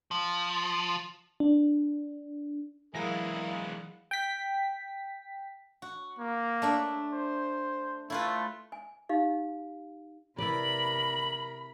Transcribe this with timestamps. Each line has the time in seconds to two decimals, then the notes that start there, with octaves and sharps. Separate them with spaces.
0.11 F3
1.40 D4
2.95 E3 F#3 G#3 E4 G#4 A#4 F5 B5
4.11 G5 B6
5.82 F#4
6.19 A#3
6.62 A3 D4 E5
7.13 C5
8.10 A3 E4 F4 B4
8.72 G#5
9.09 D#4 G4 F5
10.38 C3 E4 A#4 B4 D5 B5 F#7